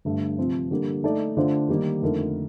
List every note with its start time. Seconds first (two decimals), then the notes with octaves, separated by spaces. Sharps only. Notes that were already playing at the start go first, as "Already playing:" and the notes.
0.05 G2 D3 A3
0.38 C3 F3 C4
0.71 D3 G3 A#3
1.04 A3 D#4 A4 D5
1.37 D3 A3 D4 F4 C5
1.69 D#3 G3 A#3 D#4
2.02 F2 D3 A3 D#4 A#4